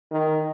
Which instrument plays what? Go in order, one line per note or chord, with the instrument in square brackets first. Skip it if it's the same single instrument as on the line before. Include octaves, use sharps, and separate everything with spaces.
[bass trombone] D#3